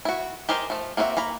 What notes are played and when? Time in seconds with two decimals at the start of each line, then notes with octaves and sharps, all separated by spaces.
0.05 E4 F#4
0.49 G4 G#4 A#4 C5 D#5
0.70 F3 A3
0.97 A#3 C4 F#4 B4 E5
1.17 A#3 A#5 B5